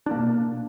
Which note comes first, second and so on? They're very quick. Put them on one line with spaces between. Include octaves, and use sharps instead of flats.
D4 A#3 B2